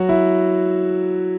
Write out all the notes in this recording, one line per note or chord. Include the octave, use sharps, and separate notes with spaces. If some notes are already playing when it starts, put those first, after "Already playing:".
Already playing: F#3 F#4
E4